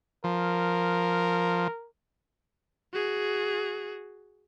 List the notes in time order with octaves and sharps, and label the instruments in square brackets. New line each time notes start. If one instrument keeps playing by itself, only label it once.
[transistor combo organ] F3 [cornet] A#4
[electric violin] F#4 G#4